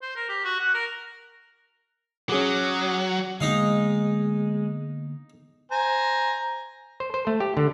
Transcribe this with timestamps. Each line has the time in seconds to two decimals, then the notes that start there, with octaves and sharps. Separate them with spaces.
0.02 C5
0.16 A#4
0.29 G4
0.44 F#4
0.60 F#5
0.74 A#4
2.30 F#3 C#4 G#4 D6
3.41 D3 G#3 A#3 B3 D#4 F5
5.72 C5 G#5 A#5
7.00 C5
7.14 C5
7.27 A3
7.40 G4
7.57 D3